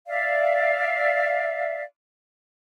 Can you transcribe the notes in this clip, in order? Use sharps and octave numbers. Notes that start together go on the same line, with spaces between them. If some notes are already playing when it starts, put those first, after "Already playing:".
D5 E5 F5